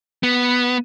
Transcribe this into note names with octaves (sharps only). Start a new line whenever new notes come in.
B3